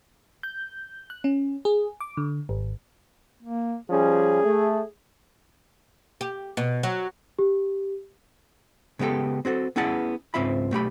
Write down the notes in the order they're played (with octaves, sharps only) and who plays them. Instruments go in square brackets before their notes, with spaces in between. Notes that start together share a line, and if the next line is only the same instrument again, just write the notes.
[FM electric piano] G6
F#6
C#4
G#4
D6
D3
G#1
[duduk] A#3
[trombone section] F3 G3 C#4 [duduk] G#4
[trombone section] A3
[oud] G4
B2
F#3
[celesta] G4
[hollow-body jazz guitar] C#3 G#3 B3 G4 A4
C4 F#4 G#4 A4
B3 C#4 E4 G#4 F#5 A5
C#2 G#2 C4 F4 E5 B5
B1 A3 G4 B5